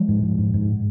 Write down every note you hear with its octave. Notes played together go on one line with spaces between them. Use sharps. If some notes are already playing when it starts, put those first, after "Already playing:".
Already playing: F3 G#3
G#2
G#2
G#2
G#2